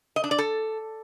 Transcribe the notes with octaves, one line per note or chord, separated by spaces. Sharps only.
D#5
D4
D5
A4